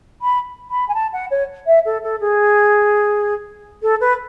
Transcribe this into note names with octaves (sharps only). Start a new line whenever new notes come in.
B5
B5
G#5
A5
F#5
C#5
E5
A4
A4
G#4
A4
B4